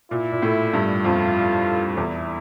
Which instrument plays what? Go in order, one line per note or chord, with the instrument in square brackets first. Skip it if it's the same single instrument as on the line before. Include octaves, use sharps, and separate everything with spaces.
[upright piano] A#2 [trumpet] E4
[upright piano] A#2
A2
G2
[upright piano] F2 [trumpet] F4
[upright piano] E2 [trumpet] E4